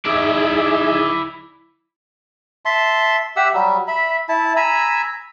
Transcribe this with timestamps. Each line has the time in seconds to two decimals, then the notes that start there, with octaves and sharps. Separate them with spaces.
0.06 D#4 E4 G#4 D5 E5
2.65 E5 A5 C6
3.36 G4 E5 F#5 E6
3.54 F#3 G3
3.88 E5 B5
4.29 E4 A5
4.56 G#5 A#5 B5 E6